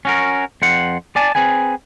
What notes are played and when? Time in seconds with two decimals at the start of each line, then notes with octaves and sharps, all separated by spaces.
0.05 C#4 F#4 A#4
0.62 F2 C5 F#5
1.16 D5 G#5 A5
1.35 C4 G#4 B4 G#5